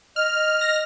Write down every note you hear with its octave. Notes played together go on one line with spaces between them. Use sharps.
D#5 F6
F6 A#6